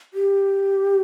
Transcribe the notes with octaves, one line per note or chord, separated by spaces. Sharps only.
G4